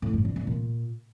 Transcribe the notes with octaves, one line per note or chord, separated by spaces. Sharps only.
A2
G2
D3
A2
A#2